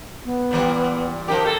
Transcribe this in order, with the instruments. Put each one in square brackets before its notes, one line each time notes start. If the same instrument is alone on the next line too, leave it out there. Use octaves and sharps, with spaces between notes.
[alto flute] B3
[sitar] A#2 E3 G3
[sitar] F3 D#4 G4 [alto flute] A#4
[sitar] A#3 A4